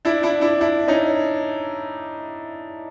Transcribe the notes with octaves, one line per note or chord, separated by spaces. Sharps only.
D4 E4
D4 E4
D4 E4
D4 E4
C#4 D#4